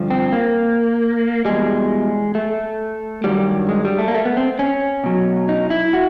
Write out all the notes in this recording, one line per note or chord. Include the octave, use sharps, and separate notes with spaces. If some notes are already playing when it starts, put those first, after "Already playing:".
Already playing: G2 D3 F3
C4
A#3
E2 B2 G3 G#3
A3
G2 D#3 F#3 G3
G#3
G3
A3
A#3
A3
B3
C4
C#4
B2 F#3
D#4
E4
F#4